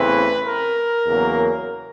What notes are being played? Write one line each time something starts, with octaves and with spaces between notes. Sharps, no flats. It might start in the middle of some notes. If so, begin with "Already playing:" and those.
Already playing: E2 C#3 E3 A3 C4 B4
A#4
E2 C#3 F#3 A#3